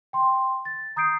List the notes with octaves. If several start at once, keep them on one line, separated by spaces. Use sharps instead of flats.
G5 C6
A6
A#5 D#6 G6 C7 D7